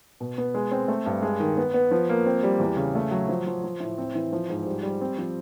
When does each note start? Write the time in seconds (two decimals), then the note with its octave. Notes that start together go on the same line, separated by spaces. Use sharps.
0.20 B2
0.38 B3
0.54 G#3
0.72 C4
0.88 A3
1.06 G2
1.22 G#3
1.40 D#3
1.57 B3
1.74 B3
1.91 F3
2.09 A#3
2.26 C4
2.43 G3
2.60 E2
2.77 C#3
2.95 A3
3.11 F#3
3.29 F3
3.47 F3
3.64 F3
3.80 A2
3.98 C4
4.15 E3
4.33 F3
4.50 G#2
4.66 G3
4.83 G3
5.01 C4
5.18 F3